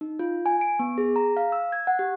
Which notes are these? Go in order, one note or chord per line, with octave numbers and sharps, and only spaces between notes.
D#4
F4
G#5
D7
B3
G#4
A#5
F5
E6
G#6
F#5
G4